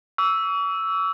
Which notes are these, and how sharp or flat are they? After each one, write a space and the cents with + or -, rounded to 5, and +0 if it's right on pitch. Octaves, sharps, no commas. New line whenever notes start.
C#6 +45 E6 +0